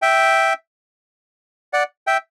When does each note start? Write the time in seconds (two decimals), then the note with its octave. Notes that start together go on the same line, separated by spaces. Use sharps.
0.02 E5 G5
1.73 D5 F#5
2.07 E5 G5